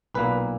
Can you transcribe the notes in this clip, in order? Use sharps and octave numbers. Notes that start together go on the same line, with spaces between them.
B1 A#2 A#3 B4